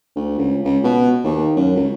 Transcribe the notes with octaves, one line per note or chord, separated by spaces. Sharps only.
D2
C#2
C#2
B2
D#2
F#2
C#2